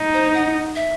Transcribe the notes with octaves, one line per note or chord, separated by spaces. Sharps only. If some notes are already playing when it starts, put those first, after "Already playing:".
Already playing: D#4
C5
F#5
E5